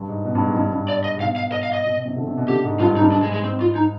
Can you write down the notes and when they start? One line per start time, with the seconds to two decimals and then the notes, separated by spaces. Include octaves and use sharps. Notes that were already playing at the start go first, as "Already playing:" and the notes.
Already playing: G2
0.08 G#2
0.24 B2
0.35 G2
0.46 G#2
0.56 G2
0.72 G2
0.88 D5
1.04 D#5
1.16 G#2
1.20 B2 F5
1.36 F5
1.52 D#5
1.63 F5
1.73 D#5
1.84 B2
1.95 B2
2.06 C3
2.17 D3
2.27 C3
2.37 B2
2.48 D3 G4
2.64 G#2
2.80 G2 F4
2.91 G#2
2.97 D#4
3.01 G2
3.12 G#2 D4
3.23 G#3
3.28 G#2
3.33 G#3
3.44 C4
3.61 F4
3.76 D#4